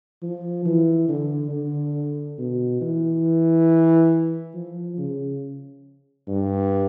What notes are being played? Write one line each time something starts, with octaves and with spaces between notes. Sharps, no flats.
F3
E3
D3
D3
B2
E3
F3
C#3
G2